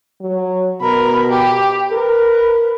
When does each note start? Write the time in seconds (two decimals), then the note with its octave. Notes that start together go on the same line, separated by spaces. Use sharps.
0.21 F#3
0.81 B2 A#4 B5
1.29 G4
1.92 A#4 B4